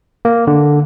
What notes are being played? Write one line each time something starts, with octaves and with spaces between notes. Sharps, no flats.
A#3
D3